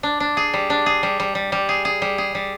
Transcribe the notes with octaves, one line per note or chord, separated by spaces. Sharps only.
D4
D4
G#4
G3
D4
G#4
G3
G3
G3
G3
G#4
G#4
G3
G#4
G3